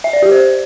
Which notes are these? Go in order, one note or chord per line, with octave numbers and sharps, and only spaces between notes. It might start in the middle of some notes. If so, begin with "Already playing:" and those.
E5
D5
G4
C5